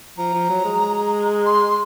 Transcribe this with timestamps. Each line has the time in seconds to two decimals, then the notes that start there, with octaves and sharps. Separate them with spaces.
0.17 F3 A#5
0.34 F3
0.49 F#3
0.64 G#3
1.45 C6